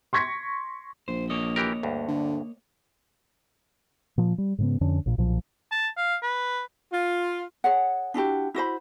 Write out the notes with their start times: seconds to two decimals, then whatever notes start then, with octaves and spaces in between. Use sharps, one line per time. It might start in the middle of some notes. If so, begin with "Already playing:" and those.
0.13 C6 C#6 G#6 A#6 B6 C#7
1.08 A#1 C5
1.30 A#3 C#5 D#5
1.56 E3 G4 A#4
1.83 D2 G2
2.08 D3
4.18 A#2 F3
4.38 G3
4.58 G#2 C#3 B3
4.81 F2 D3 C#4 D4
5.06 A#1 A#2
5.18 B1 A#2 F3
5.71 A5
5.97 F5
6.23 B4
6.93 F4
7.64 G#4 C#5 F#5
8.14 D4 E4 F#4 G4
8.55 E4 F#4 C5 B5